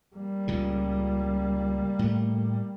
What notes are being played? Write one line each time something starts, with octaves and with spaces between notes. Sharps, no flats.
G3 A#3
C#2 A#2 C#3
A2 A3